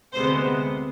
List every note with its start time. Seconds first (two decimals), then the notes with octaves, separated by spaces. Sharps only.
0.13 D2 C3 G#3 B3 C5